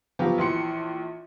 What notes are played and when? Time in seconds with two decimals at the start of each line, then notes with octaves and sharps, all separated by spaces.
0.19 F3 F#3 B3 F4 G4
0.38 A#1 E3 C6 C#7